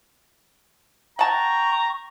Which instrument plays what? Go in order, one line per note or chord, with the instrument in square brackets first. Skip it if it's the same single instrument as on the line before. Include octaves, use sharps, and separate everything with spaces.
[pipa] F#5 A5 [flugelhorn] G5 [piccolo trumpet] A#5 [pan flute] C#6